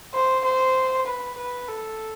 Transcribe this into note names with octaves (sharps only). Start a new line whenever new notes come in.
C5
C5
B4
B4
A4